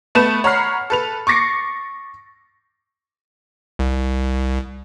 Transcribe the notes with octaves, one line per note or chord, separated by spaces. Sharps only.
A3 B3 B4 A5 E7
C#5 F#5 A#5 B5 F6 C7
A4 B4 F7
C#6 D6 A6 A#6 C7 C#7
C2